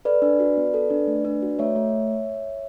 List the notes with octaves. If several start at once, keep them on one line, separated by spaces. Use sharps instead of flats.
A4 B4 D5
D4
F#4
B3
A4
D4
A3
D4
F#4
A3 C#5 E5
A3